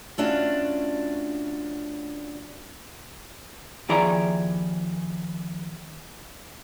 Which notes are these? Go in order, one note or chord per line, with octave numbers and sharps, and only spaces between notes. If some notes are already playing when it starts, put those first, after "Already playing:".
A3 C#4 D4 F4 F#4
D#2 F3 E4 G#4 D5 A#5